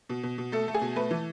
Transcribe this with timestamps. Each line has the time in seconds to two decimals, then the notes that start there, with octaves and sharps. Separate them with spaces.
0.09 B2
0.23 B2
0.38 B2
0.52 A3 A4
0.68 A3
0.74 G#4
0.81 B2
0.96 A3 B4
1.11 E3